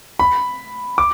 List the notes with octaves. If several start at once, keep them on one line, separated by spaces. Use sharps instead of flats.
B5
D6